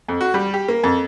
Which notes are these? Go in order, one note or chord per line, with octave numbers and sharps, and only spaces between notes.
F2
F#4
G3
G4
A#3
F2